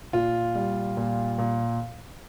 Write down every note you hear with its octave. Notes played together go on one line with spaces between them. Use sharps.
A#2 F4
G3
A#2
A#2